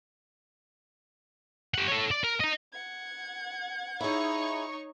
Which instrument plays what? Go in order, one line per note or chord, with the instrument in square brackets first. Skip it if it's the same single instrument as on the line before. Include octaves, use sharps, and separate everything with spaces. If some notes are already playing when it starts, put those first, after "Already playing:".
[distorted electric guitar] G4 F#5
A4 C#5
D5
A#4
D#5 A#5
[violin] F#5 G#6
[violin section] D#4 C#5 C#6 [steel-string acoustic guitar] E4 G#4